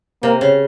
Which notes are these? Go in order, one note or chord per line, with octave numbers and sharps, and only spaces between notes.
C3 A#3
C#3